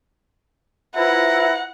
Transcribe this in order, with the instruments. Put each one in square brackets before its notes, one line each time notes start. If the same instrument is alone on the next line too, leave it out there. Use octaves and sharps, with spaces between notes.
[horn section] E4 [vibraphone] F4 B4 C5 [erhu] F#5 [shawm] A#5